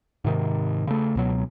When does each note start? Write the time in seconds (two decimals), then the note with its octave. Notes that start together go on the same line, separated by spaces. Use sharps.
0.24 G#2 C3 D#3
0.87 C#3 A3
1.15 C#2 B2 F#3